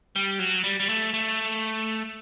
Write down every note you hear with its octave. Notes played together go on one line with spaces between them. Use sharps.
G3
F#3
G3
G3
A3
A3